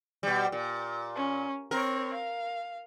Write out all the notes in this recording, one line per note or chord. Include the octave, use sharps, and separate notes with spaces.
B2 G3
A#2
C#4
C4 A#4 C#5
F5